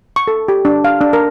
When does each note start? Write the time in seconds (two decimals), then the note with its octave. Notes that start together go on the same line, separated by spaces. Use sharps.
0.16 C#6
0.28 A4
0.48 G4
0.65 D4
0.84 F5
1.01 D4
1.13 A#4